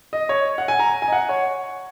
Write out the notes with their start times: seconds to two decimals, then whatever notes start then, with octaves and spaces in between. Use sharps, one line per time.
0.13 D#5
0.29 C#5
0.58 F#5
0.68 G#5
0.79 A#5
1.02 G#5
1.08 D#5
1.12 F#5
1.29 C#5